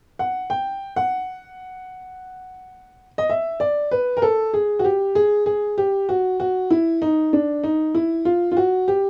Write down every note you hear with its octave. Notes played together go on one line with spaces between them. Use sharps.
F#5
G5
F#5
D#5
E5
D5
B4
A#4
A4
G#4
F#4
G4
G#4
G#4
G4
F#4
F#4
E4
D#4
D4
D#4
E4
F4
F4
F#4
G4